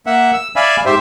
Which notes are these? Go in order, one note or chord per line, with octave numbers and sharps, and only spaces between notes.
A#3 E5 F#5
E6
D5 E5 F5 G#5 B5
G#2 G4 C5 E5